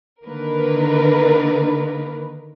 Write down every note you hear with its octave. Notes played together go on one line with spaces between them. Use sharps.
D3 D#3 A#3 A#4 B4